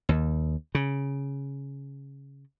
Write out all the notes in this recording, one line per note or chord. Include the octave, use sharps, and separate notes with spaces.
D#2
C#3